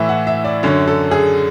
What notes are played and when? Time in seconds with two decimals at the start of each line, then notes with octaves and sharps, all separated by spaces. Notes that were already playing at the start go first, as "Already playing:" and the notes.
Already playing: A2 E3 E5
0.09 F#5
0.27 E5
0.44 D5
0.63 F#2 D3 C#5
0.88 A4
1.11 G#4